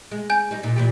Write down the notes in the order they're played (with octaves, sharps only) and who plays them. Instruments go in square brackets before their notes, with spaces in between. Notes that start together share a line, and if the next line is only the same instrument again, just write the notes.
[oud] G#3
[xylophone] G#5 G6
[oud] G3 D#4
A#2 D#4
A#2 E3 G4